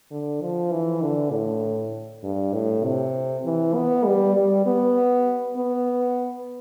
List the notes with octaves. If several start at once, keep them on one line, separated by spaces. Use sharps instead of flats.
D3
F3
E3
D3
A2
G2
A2
C3
E3
B3
G3
G3
B3
B3